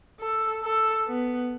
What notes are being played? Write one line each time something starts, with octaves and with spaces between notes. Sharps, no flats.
A4
A4
B3